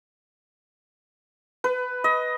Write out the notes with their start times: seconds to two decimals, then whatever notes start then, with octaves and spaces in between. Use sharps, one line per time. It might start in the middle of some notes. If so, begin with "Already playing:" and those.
1.64 B4
2.04 D#5